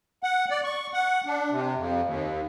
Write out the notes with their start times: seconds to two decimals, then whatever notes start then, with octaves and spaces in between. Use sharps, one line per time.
0.23 F#5
0.50 D5
0.64 C#6
0.93 F#5
1.26 D4
1.50 C3
1.77 F2
2.04 D#2